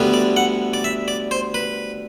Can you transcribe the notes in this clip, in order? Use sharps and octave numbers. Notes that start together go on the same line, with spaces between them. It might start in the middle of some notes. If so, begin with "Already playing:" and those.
Already playing: D2 D3 G3 B3
D5
F#5
D5
E5
D5
C5
B4